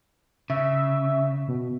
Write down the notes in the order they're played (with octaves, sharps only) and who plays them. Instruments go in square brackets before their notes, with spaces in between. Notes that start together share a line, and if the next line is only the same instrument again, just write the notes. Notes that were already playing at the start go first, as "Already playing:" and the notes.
[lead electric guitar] C#3 [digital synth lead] E5
[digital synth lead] B2